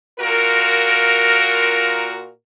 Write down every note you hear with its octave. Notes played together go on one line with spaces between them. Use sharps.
A#2 F4 F#4 A#4